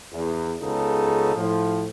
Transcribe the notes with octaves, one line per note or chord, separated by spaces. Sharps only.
E2
C#2 C#3 B3 D#4 A4
A2 F3